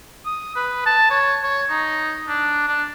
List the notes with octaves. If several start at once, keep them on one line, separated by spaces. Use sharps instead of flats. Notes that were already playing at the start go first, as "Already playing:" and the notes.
D#6
B4
A5
C#5
C#5
D#4
D4
D4